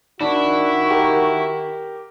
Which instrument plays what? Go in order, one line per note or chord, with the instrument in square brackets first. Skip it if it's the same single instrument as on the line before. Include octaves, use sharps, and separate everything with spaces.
[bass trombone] D#3 [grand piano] D4 [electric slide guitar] E4 [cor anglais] F#4
[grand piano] G4 A#4